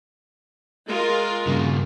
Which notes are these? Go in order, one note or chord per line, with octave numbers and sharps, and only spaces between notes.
G#3 F4 A#4
G2 C#3